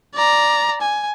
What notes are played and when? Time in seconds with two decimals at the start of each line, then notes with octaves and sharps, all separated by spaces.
0.15 D5 A#5
0.82 G#5